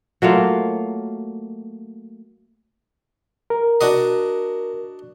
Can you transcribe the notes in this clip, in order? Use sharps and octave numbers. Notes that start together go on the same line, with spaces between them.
F#3 A3 A#3 F4
A#4
D4 F#4 D#5